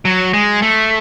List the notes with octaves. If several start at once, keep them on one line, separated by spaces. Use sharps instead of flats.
F#3
G#3
A3